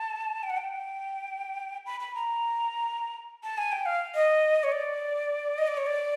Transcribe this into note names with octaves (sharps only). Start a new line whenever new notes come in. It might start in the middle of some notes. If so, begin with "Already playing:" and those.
Already playing: A5
G5
F#5
G5
B5
B5
A#5
A5
G#5
G5
F5
D#5
C#5
D5
D#5
D5
C#5
D5